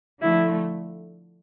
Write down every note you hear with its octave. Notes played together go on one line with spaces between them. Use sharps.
D3 F3 A3 E4